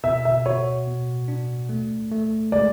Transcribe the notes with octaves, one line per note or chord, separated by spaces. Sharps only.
B2 E5
E5
F#4 C#5
B2
D4
A3
A3
G#3 D5